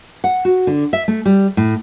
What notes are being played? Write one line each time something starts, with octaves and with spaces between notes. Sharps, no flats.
F#5
F#4
D3
E5
A3
G3
A2